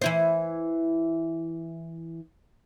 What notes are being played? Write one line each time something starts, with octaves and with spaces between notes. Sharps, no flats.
E3 E4 C5